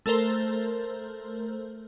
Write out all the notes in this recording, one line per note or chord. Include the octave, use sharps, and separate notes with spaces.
A3 A4 A#4 C5